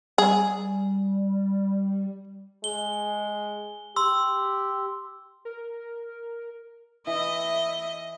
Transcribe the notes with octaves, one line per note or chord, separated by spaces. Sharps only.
G3 G#4
G#3 G7
G4 C6 E6
A#4
E3 D#5 E5